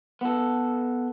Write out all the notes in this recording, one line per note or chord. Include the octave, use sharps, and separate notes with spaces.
B3 A4